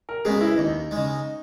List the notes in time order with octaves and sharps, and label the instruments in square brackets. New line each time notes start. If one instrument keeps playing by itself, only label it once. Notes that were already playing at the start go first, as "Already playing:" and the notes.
[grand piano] A#4
[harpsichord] C#3 G#3 B3 [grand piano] G#4
[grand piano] E4
[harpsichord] D#2 [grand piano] D#4
[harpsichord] C#3 G#3